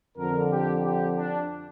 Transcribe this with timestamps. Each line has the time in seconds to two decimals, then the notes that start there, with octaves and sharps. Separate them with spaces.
0.18 F2 D3 A#4
0.52 G4
0.84 G4
1.17 D4